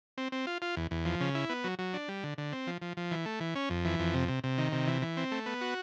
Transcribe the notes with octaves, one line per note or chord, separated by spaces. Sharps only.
C4
C4
F4
F4
E2
E2
F3
C#3
E4
B3
F#3
F#3
D4
G3
D3
D3
C4
F3
F3
F3
E3
A3
E3
C#4
F2
E3
F2
C3
C3
C3
D#3
C3
E3
E3
C4
A3
B3
F#4